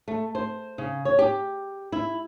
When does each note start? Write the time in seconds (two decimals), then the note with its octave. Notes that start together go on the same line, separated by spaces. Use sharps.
0.08 A3
0.35 C5
0.78 C#3
1.05 C#5
1.19 G4
1.92 E4